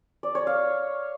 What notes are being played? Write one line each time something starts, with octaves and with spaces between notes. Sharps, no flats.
D5
C#5
F5